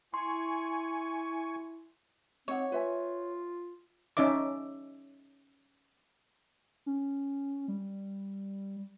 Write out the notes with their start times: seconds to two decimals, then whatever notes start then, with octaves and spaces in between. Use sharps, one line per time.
0.14 E4 G#5 C6 C#6
2.48 C4 D#4 C#5 F#5
2.72 F4 B4 E5 G#5
4.17 C#4 D#4 D5 E5 D6
6.86 C#4
7.68 G3